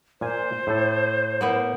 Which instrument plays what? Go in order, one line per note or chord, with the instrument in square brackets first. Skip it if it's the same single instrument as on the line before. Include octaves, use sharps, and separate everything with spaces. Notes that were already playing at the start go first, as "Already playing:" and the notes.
[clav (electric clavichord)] A#2 G#5 [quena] C5
[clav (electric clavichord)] A2 A4
[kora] A#3 B3 E4